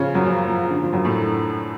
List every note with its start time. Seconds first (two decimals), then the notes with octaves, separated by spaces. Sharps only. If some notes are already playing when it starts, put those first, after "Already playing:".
Already playing: C#3 F3 C#4 F4
0.14 F#2 F#3
0.26 F3
0.48 F3
0.71 D3
0.82 F3
0.93 F#2 F#3
1.05 A2 A3